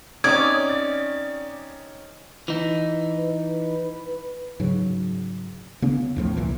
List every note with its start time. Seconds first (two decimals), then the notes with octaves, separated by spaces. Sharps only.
0.24 C4 C#4 D#4 C#5 D5 D#6 G#6
0.69 A6
2.48 E3 D#4
3.18 B4
4.60 G#2 C#3 F#3
5.82 C#3 B3 D4
6.16 E2 A2 F3
6.37 C2 A#2 E3